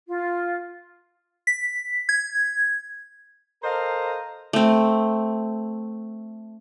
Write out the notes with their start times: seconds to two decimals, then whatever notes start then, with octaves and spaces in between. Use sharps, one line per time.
0.08 F4
1.47 B6
2.09 G#6
3.63 A4 A#4 C5 D#5 F5 A#5
4.53 A3 C4